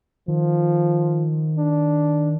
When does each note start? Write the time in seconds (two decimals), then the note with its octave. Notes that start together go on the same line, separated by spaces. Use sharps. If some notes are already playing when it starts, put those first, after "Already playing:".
0.28 D#3 F3
1.58 D4